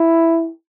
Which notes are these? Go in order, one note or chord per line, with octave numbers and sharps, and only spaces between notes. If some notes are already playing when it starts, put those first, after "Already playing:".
Already playing: E4